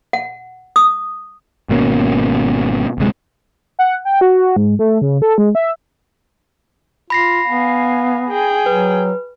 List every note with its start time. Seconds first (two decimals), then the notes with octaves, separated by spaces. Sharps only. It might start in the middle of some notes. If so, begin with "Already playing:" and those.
0.13 F#5
0.76 D#6
1.69 G#1 B2 A#3 C#4
2.98 D1 C3 G#3
3.79 F#5
4.05 G5
4.21 F#4
4.57 G#2
4.79 A3
5.02 C#3
5.22 A4
5.38 G#3
5.55 E5
7.10 F4 B5 A#6 C7
7.48 B3 F5 G#5
8.29 G#4 G5
8.66 F#3 B4